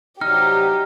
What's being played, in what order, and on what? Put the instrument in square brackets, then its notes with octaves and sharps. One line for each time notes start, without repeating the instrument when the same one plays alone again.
[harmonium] C3 F#3 G3 [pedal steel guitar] D#4 [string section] G4 [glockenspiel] F6